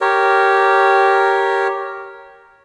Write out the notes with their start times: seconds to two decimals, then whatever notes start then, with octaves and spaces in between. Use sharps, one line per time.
0.01 G4 A#4 C#5